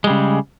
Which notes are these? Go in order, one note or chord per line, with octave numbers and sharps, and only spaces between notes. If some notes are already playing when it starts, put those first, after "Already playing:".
C#3 G3 G#3